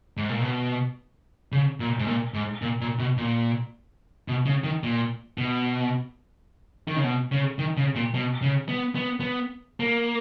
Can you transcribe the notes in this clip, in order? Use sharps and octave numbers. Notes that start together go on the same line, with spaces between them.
G#2
A#2
B2
C#3
A#2
G#2
A#2
G#2
A#2
A#2
B2
A#2
B2
C#3
D#3
A#2
B2
D#3
C#3
B2
C#3
D#3
C#3
A#2
B2
C#3
B3
B3
B3
A#3